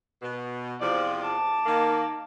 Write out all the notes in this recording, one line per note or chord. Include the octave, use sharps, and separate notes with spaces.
B2
E2 C3 F3 D5
A5 D6
D#3 A#3